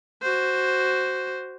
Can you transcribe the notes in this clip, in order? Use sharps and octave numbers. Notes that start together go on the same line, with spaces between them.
F#4 C5